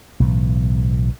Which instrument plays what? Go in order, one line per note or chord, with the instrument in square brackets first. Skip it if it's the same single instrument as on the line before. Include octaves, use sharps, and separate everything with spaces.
[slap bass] B1 A2 E3